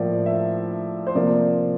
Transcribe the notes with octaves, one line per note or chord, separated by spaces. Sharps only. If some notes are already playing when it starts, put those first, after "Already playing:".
Already playing: A2 F3 A#3 D5
E5
C5
C3 F3 A#3 D5